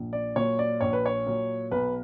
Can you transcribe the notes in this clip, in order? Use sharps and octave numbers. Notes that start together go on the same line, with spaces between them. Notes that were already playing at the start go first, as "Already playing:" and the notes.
Already playing: A#1
D5
A#2 F#3 C#5
D5
A#1 C#5
B4
C#5
A#2 F#3
B1 B4